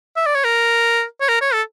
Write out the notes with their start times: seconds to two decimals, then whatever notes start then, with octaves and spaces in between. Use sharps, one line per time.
0.16 E5
0.26 D5
0.35 C#5
0.44 A#4
1.21 C#5
1.28 A#4
1.41 C#5
1.53 A4